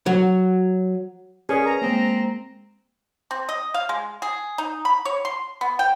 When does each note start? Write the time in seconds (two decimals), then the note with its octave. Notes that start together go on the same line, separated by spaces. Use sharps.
0.06 F#3
1.49 C#4 G#4 A#4 B4 D5
1.66 A#5
1.82 G#3 A#3 C4
3.31 C4
3.49 D#5
3.74 F5
3.89 G#3
4.22 G#4
4.58 D#4
4.85 B5
5.05 C#5
5.25 C6
5.61 B3
5.79 G5